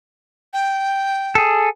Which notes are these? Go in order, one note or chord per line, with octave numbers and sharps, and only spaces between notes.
G5
G#4 A4